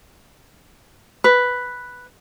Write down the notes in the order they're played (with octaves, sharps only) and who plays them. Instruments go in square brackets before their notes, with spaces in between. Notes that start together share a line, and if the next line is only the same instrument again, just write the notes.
[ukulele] B4